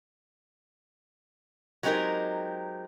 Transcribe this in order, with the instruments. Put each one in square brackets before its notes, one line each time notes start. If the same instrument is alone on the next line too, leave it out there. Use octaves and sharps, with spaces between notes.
[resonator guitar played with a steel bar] F#3 G#3 C4 D#4 G4 A#4